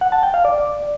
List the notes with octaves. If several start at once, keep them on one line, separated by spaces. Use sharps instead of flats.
F#5
A5
G5
F5
D5